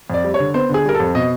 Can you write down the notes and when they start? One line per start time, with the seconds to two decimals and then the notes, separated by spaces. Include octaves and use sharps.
0.10 F2 D5
0.24 G3
0.34 C#5
0.39 D3
0.54 B3 C5
0.69 D3 G#4
0.85 G3 A#4
0.95 A4
1.00 F2
1.15 B2 D#5